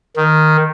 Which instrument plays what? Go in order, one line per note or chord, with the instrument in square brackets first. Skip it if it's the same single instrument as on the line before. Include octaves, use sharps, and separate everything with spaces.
[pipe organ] D#3